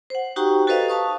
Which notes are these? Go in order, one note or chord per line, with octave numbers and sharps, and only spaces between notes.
C5 F#5
D#4 F#4 G4 G5 A#5 C#6
F#4 A4 B4 C5 D#5 F5
F5 A5 C#6 D#6